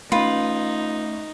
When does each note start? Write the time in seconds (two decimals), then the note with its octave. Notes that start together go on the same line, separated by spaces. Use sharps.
0.12 A3 C#4 D#4 F4 B4